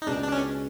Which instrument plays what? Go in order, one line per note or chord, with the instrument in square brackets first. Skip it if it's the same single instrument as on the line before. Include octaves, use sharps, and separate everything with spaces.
[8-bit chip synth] D#4
[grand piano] C#2 B2 G#3 [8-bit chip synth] D4
[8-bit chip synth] D4
C#4